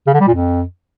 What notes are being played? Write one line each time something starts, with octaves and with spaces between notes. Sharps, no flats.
C#3
D3
G3
A#2
F2